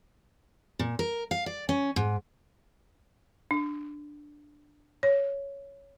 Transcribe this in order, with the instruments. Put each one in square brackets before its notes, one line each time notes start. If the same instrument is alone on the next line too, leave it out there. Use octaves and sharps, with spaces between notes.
[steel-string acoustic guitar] A#2
A#4
F5
D5
C#4
G#2
[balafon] D4
C#5